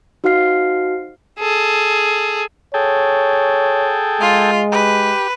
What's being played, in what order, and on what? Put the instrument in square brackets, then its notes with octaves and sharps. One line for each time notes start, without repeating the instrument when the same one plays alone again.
[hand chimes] D#4 F#4 C5 F5 F6 C7
[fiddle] G#4 A4
[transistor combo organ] G#4 A4 G5 [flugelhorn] C#5
[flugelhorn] G#3 [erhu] F4
[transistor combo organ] G4 [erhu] B4